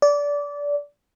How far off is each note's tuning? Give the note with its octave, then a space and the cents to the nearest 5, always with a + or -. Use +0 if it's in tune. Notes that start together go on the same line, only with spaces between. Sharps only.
D5 -20